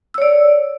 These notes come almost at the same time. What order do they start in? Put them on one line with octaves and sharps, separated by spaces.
E6 C#5 D5